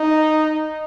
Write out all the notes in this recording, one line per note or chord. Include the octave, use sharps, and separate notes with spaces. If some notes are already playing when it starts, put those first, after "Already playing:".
Already playing: D#4